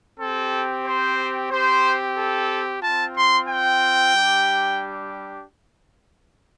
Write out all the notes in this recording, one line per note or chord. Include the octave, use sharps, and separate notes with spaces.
C4 G4 A4
C5
C4 G4 C5
A4
C4 F4 A5
C6
G5
G3 D4 G4